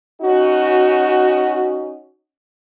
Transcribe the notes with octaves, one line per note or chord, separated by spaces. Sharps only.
C#4 D#4 F#4